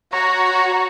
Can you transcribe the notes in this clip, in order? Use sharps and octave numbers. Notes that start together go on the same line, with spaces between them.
F#4 C#5 A#5